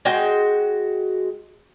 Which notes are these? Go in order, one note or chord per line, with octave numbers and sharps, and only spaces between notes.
G#3 F#4 G5